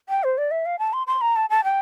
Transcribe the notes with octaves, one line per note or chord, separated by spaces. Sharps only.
G5
C5
D5
E5
F5
A5
C6
C6
A#5
A5
A5
G5